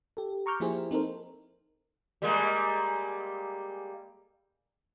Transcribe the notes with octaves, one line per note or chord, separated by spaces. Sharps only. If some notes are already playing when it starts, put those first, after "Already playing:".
G4 A4
A#5 C#6 D6 F6 G6
F3 A#3 E4 G4 G#4 C5
C4 D#4 A4 A#4 C5
G3 G#3 A#3